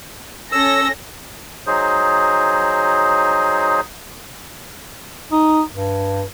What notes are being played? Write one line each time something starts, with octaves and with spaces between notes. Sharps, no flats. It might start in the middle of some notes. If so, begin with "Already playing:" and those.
C#4 A4 E6 A#6
F#3 D#4 G#4 C5
D#4
G2